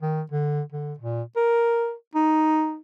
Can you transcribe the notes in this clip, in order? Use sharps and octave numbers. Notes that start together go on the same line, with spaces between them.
D#3
D3
D3
A#2
A#4
D#4